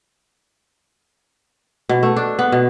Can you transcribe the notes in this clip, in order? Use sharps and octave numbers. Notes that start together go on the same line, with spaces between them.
B2
A3
D4
B3
B2